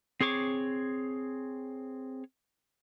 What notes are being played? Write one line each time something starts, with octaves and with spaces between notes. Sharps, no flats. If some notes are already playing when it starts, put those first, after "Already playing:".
C4 G#4 C#5 C#6 D6